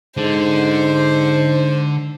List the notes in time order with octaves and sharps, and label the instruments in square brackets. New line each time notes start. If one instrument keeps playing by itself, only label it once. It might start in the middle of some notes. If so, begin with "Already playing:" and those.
[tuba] G#2 [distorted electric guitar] D3 [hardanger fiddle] C5